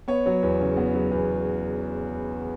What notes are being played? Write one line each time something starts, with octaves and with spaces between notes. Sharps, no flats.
B3 C#5
F#3
E2
C#3
B3
F#3
E2